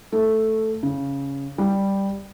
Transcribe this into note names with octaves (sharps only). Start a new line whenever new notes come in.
A3
C#3
G3